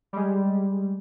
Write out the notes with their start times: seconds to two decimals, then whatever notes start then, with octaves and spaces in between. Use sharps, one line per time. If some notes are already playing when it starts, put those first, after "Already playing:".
0.13 G3 G#3